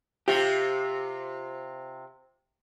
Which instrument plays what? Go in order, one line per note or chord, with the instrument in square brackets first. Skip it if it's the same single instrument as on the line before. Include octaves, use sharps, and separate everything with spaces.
[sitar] C3 F4 [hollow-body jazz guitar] G4